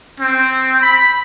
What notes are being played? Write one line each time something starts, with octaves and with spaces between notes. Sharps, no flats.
C4
B5